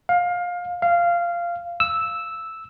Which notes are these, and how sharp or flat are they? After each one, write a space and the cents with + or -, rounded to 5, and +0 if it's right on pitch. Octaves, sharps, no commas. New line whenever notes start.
F5 +20
F5 -15
E6 -5